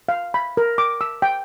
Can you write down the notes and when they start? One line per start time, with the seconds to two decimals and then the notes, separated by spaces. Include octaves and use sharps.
0.09 F5
0.34 B5
0.57 A#4
0.78 D6
1.01 E6
1.22 G5